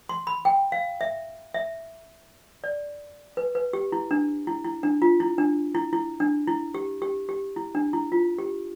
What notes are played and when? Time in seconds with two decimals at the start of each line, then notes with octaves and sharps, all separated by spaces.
0.09 C6
0.27 B5
0.45 G5
0.72 F5
1.01 E5
1.54 E5
2.64 D5
3.37 B4
3.55 B4
3.73 G4
3.92 E4
4.11 D4
4.47 E4
4.64 E4
4.83 D4
5.02 F4
5.20 E4
5.38 D4
5.75 E4
5.93 E4
6.20 D4
6.48 E4
6.74 G4
7.02 G4
7.29 G4
7.56 E4
7.75 D4
7.93 E4
8.12 F4
8.38 G4